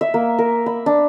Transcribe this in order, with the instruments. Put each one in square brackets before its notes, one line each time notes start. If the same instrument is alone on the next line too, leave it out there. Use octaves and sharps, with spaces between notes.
[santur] E5
A#3
A#4
B5
D4